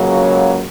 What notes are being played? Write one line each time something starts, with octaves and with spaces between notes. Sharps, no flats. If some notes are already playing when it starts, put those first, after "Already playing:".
Already playing: C#2 C#3 F#3 A#3